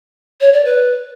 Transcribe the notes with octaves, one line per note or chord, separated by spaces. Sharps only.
C#5
D5
B4